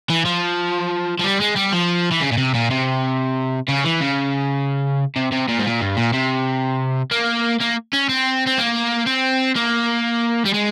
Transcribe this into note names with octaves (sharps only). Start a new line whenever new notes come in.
E3
F3
F3
G3
G#3
G3
F3
E3
C#3
A#2
C3
A#2
C3
C#3
E3
C#3
C3
C3
A#2
G#2
A#2
G2
A#2
C3
A#3
A#3
C#4
C4
C4
A#3
C4
A#3
G3
G#3